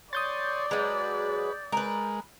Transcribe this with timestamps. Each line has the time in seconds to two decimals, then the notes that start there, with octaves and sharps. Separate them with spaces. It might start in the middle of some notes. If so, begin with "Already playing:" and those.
0.13 C#5 D5 C6 D#6 G6 A6
0.71 F#3 G#3 B4
1.72 G#3 A#4 B4